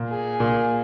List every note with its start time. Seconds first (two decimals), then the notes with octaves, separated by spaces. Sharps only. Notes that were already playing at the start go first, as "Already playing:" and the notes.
Already playing: A#2
0.10 G#4
0.40 A#2